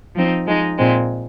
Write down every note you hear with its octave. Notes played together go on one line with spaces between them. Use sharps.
F3 C4 D#4
F3 G#3 D#4
A#2 G#3 C4